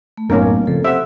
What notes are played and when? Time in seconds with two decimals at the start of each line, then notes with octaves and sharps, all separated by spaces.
0.17 A3
0.30 B1 F#2 A2 A3 A#3 C#4 A#4
0.67 F2 C#3 F3 A4
0.85 C3 C5 E5 F#5